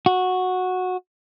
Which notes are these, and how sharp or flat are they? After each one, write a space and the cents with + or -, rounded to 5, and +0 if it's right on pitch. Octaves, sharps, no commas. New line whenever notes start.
F#4 -10